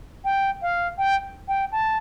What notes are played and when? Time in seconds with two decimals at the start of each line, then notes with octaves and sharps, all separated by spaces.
0.25 G5
0.62 F5
0.98 G5
1.48 G5
1.72 A5